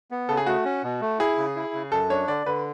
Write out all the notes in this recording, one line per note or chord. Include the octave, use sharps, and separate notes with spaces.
B3
C#3 A4
G#4
A3 F#4
C#4
B2
A3
E4 G#4
C#3
E4
C#3
F#2 A4
D4 C#5
D3 D5
D3 B4